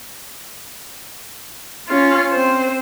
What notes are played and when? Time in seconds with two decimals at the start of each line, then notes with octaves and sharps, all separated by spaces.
1.88 C#4 F4
2.31 C4 C5